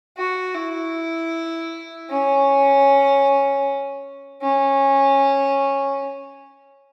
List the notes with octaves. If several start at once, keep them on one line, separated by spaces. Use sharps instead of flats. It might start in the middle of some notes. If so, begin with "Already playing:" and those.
F#4
E4
C#4
C#4